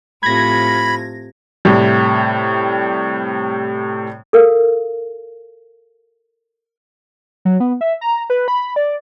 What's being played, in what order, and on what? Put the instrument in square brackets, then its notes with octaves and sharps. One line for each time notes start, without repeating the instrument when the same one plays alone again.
[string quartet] A2 C3 F3 [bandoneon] B5 [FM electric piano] G#6 A#6
[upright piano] A2 C3 G3
[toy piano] A4 A#4 F5
[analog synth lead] F#3
B3
E5
A#5
B4
B5
D5